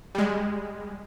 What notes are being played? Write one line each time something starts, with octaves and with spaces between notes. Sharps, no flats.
G3 G#3